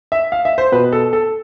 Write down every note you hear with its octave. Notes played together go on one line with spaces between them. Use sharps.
E5
F5
E5
C5
B2 B4
A4
A4